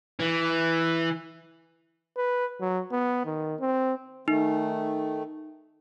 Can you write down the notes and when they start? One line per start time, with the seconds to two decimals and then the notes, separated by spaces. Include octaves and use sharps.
0.20 E3
2.17 B4
2.61 F#3
2.92 B3
3.25 D#3
3.60 C4
4.28 D#3 A3 D#4